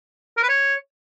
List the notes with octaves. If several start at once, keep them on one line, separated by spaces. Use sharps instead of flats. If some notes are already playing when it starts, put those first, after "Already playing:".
A#4
B4
C#5